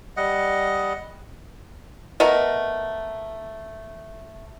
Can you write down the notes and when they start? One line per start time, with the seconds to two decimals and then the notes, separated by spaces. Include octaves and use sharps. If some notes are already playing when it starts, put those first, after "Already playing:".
0.17 G3 D#5 F#5
2.20 A3 B3 A#4 D#5